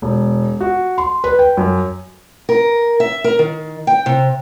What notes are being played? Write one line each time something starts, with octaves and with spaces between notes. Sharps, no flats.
E1
F#4
C6
B4
G5
F#2
A#4
E5
A#4
D#3
G5
C3